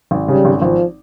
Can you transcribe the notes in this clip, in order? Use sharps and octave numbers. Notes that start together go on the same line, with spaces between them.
G#1
C#3 G3
G#1
G#1 F3